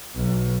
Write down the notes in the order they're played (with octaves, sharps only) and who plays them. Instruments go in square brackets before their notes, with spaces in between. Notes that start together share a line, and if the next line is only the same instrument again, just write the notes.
[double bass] B1